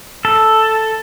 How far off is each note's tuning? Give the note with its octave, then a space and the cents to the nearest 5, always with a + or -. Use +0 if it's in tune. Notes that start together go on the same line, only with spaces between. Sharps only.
A4 +0